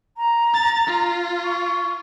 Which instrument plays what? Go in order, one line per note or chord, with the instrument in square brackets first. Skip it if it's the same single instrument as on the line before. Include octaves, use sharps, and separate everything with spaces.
[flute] A#5
[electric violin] A6
F4
[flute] C#6